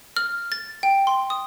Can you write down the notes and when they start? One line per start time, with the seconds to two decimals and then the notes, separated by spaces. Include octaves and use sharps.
0.17 F6
0.52 A6
0.83 G5
1.07 C6
1.30 D#6